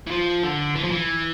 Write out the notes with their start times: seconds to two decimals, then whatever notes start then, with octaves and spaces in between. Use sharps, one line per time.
0.07 E3
0.11 F3
0.43 D3
0.76 E3
0.84 F3
0.91 E3